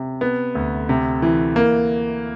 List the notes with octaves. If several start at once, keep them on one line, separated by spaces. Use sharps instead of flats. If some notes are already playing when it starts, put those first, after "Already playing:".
Already playing: C3
B3
D2
C3
E3
A#3